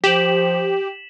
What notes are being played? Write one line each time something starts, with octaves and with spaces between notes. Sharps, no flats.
F3 G4 B6 E7 F#7